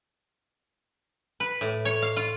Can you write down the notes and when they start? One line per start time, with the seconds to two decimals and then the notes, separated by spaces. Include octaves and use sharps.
1.40 B4
1.61 A2
1.85 C#5
2.02 F5
2.16 F4